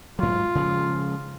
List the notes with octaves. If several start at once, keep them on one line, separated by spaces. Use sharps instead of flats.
G#2 F#3 F4
C#3 F3 G#3